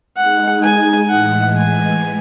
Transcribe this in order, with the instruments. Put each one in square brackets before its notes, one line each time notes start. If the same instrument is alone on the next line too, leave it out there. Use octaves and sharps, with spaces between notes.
[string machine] G#3 D#4 G#4 [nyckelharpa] F#5
[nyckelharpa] G#5
[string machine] A2 E3 G#3 [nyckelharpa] F#5
[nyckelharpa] G#5